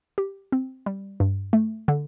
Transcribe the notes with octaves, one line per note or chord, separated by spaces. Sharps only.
G4
C4
G3
G2
A3
D3